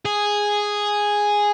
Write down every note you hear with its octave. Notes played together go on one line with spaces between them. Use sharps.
G#4